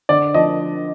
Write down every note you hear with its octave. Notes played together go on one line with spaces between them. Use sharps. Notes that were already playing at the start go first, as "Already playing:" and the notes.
D3 D5
F3 D#5